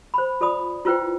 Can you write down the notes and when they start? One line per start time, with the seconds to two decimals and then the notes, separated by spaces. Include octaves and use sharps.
0.14 C5 B5
0.41 F4 A4 D5 B5 D#6
0.85 E4 F4 B4 C5 G5